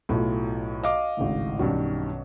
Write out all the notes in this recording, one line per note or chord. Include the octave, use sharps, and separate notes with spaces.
B1 A2 F4
D#5 F5 D6
G#1 C#2 A2
B1 G2 D#3 C#4 F#4